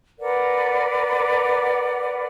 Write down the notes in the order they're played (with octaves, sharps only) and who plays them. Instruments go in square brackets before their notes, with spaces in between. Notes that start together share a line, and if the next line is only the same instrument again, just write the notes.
[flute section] A#4 B4 D5 F#5